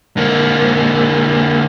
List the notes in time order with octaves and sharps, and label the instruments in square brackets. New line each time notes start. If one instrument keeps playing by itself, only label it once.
[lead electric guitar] D3 A#3